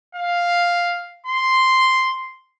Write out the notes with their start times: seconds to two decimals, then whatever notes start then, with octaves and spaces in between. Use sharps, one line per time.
0.15 F5
1.27 C6